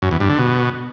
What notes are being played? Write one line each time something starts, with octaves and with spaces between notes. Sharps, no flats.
F#2
E2
G2
D3
B2